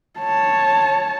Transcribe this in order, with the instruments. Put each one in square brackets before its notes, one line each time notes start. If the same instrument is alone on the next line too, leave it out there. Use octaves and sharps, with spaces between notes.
[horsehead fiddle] C#5 A5